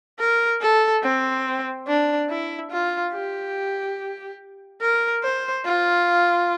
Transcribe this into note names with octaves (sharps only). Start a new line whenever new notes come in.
A#4
A4
C4
D4
E4
F4
G4
A#4
C5
F4